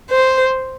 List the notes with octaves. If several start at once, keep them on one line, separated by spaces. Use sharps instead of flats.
C5